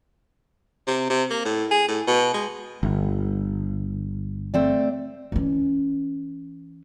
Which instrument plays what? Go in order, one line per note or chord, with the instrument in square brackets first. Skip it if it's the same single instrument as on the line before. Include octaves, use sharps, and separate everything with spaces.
[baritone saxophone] C3
C3
A#3
A2
G#4
A2
B2
G#3
[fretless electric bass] G1
[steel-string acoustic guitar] A3 C4 D5
[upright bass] E3 C#4